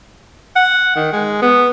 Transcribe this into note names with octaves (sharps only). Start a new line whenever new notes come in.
F#5
D#3
G#3
B3